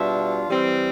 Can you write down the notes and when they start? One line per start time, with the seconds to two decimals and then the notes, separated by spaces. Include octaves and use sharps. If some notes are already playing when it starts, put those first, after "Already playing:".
Already playing: B2 G3 D4 F4 E5
0.48 E3 G3 C4